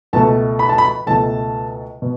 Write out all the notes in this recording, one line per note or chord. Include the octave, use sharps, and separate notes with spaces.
C#2 B2 A3 A5
B5
A5
B5
C#2 B2 A3 A5
B2